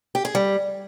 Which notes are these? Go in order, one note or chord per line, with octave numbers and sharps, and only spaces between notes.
G4
G#4
G3